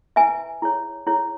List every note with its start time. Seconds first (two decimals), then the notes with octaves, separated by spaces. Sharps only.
0.16 E4 B4 E5 G#5
0.62 E4 G#4 C#5
1.07 E4 G#4 C#5